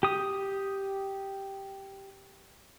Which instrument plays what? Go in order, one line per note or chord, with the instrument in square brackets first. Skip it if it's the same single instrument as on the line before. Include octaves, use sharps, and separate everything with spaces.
[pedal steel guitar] G4 D#6